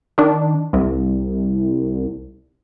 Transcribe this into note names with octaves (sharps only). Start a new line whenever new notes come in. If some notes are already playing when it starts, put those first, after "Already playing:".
D#3 D4
C2